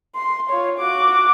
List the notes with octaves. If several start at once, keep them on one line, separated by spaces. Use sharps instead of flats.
C6
F4 C#5
F#4 D6